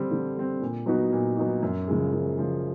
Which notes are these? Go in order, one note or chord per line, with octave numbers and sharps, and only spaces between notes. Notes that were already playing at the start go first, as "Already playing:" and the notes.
Already playing: D3 G3 C4
D3
G3 C4
A#2
F#3 B3 D#4 F#4
A#2
F#3 B3 D#4 F#4
F#2
C#3 F3 G#3
F#2
C#3 F3 G#3